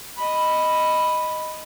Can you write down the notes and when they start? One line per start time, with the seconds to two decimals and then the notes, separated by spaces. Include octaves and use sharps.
0.18 D#5 B5